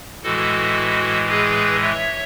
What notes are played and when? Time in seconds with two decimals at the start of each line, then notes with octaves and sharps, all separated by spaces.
0.23 A2 E3 G#3 F#4 A4
1.29 G#4 B4
1.82 C#5 E5